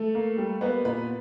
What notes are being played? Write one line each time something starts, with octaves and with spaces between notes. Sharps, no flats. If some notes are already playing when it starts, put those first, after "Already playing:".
Already playing: A3 A4
A#3
G3
A#3 B3 B4
A#2 B3 B4